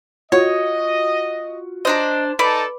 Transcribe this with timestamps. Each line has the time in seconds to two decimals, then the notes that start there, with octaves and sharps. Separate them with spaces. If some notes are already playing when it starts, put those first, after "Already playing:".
0.32 F4 F#4 C#5 D#5
1.85 D4 C5 D#5 A#5
2.39 D#4 A4 B4 D5 A5